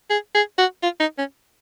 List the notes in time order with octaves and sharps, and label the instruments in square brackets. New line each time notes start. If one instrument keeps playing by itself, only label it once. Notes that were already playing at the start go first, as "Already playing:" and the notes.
[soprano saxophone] G#4
G#4
F#4
F4
D#4
C#4